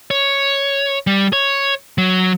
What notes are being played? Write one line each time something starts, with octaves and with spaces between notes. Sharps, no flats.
C#5
G3
C#5
F#3